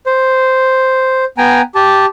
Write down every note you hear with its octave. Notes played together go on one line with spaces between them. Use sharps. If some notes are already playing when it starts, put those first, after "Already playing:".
C5
B3 G5 G#5 A#5
G4 A5